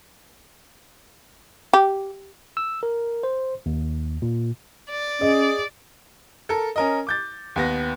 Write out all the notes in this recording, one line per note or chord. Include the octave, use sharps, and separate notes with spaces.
G4
E6
A#4
C5
D#2
A#2
D5
C#4 G#4 D#5
A4 A#4
C#4 A#4 D#5
D6 G6 A6
D#2 B3 A#6